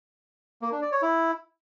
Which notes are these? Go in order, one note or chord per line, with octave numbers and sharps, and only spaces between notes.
A#3
D4
D5
C#5
E4